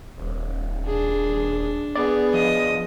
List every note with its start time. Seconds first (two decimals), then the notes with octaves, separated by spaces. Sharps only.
0.18 D#1
0.87 D4 G#4
1.96 B3 G#4 D5
2.34 F3 D#5